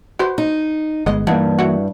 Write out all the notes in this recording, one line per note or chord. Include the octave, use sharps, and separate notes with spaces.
F#4 B4 C5
D#4
G1 G#3 B3 D#5
G2 E3 A#3 D#4 F#5
E4 F#4